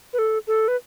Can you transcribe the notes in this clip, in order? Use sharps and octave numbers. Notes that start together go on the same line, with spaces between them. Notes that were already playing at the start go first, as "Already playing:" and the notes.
B4
A4
A4
B4